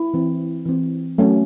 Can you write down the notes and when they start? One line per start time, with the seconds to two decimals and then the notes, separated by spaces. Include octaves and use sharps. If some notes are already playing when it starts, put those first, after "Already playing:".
Already playing: E4
0.14 E3 C4
0.66 E3 C4
1.18 F#3 A3 C#4